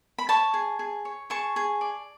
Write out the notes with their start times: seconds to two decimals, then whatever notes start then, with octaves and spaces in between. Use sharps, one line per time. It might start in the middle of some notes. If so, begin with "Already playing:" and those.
0.18 B5
0.29 C#5 A5 C#6
0.54 G#4
0.79 G#4
1.05 C#5
1.30 G#4 A5 C#6
1.56 G#4
1.81 D5